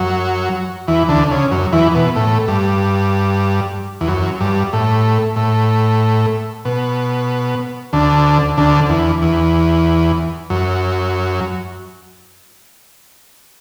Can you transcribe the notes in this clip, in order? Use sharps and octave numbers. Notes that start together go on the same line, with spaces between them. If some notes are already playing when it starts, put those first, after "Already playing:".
Already playing: F#2 F#3
E2 E3
D2 D3
C#3
F#2
E2 E3
B2
A2
G2
E2
F#2
G2
A2
A2
B2
D2 D3
D2 D3
E2
E2
F#2